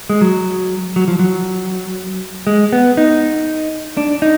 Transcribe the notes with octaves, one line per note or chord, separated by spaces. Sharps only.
G#3
F#3
F#3
F3
F#3
G#3
B3
D#4
D4
D#4